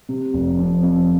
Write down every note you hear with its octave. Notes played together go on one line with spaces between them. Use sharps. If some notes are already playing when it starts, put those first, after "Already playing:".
C3
F1
F2
F2